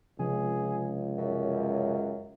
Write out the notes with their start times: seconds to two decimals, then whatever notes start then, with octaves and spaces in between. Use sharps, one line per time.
0.19 C#2 C3 F3 G#4
1.18 F#2